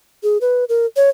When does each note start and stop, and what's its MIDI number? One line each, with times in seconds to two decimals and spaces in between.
0.23 0.38 68
0.41 0.64 71
0.69 0.86 70
0.96 1.09 73